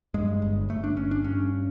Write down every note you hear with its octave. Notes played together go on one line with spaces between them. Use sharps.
G2 G#3
G1
G1 A3
D4
G1 C#4
D4
G2 C#4